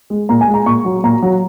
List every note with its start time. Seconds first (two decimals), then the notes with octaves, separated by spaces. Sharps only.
0.10 G#3
0.29 A#2 A#5
0.41 G#5
0.48 G#3
0.54 A#5
0.66 A#2 C#6
0.85 F#3
1.04 A#2 A#5
1.22 F#3